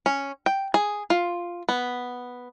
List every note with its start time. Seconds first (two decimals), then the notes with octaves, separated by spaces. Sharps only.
0.06 C#4
0.46 G5
0.74 G#4
1.10 F4
1.69 B3